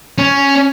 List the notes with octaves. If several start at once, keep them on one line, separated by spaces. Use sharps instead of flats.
C#4